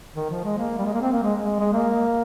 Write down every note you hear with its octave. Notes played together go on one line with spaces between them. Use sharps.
D#3
F3
G#3
A#3
G3
G#3
A#3
C4
A#3
G#3
G#3
G#3
A#3